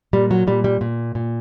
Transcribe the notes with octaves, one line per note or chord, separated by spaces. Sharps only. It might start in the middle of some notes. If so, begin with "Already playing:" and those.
A#2 G3
F#3
A#2 G3
G3
A#2
A#2